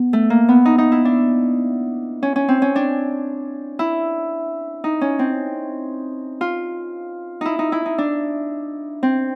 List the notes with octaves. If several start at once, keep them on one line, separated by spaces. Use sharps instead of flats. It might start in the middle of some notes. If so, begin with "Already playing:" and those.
Already playing: B3
A3
A#3
B3
D#4
D#4
E4
D4
C#4
C#4
C4
C#4
D4
E4
D#4
C#4
C4
F4
D#4 E4
D#4
E4
D#4
D4
C4